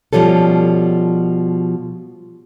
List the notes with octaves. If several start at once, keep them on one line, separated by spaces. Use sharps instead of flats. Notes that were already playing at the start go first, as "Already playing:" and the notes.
B2 F3 G3 C#4 A4